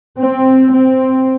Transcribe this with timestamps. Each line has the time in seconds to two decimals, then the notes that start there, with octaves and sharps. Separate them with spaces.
0.18 C4
0.73 C4